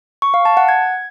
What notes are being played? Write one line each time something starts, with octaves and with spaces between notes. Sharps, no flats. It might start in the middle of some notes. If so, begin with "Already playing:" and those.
C#6
F5
A5
F#5
G#6